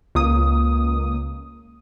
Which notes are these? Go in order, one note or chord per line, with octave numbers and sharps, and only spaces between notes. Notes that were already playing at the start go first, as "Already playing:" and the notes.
C#2 A#3 D#6